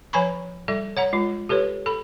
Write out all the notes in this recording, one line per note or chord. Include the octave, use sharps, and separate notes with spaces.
F3 C#5 G#5 A#5 B5 C#6
G3 A4 E5
C#5 F#5 A#5
G#3 F4
G4 A4 B4 C#5
A4 B5